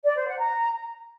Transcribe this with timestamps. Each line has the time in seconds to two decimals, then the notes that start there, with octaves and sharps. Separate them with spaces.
0.04 D5
0.16 C5
0.27 F#5
0.39 A#5